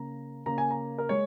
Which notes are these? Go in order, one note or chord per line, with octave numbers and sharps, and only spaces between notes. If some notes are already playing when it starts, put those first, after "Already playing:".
Already playing: C#3 A#3 A#5
C#3 A#3 A#5
G#5
A#5
A#4
G#3 C#5